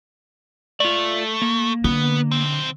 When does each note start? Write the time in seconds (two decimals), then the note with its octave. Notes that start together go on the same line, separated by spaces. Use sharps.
0.80 A3 F4 D5
1.42 A#3
1.84 D3 B3
2.31 B1 C4